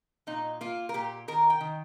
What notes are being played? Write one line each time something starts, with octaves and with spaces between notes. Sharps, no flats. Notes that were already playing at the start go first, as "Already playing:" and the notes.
A#2 D#4
A#3 F4
A#4
A#2 G4
D#3 A#4
G5
D#3